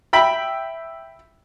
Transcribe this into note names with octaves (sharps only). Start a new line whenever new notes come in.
E5 G5 B5